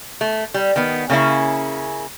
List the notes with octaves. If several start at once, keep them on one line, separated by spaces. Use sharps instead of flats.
A3
G3
D#3 B3
C#3 A#3 C#4 E4